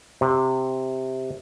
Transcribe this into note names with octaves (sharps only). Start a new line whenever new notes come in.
C3